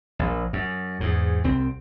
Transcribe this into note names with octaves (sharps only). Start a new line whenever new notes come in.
A#1
F#2
E2 G#2
C2 C4